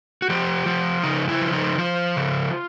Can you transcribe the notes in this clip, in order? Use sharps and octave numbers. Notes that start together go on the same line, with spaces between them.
F#4
F3 G4
F3
C#3 D#4
E4
F3
D#4
F3 F4
C#3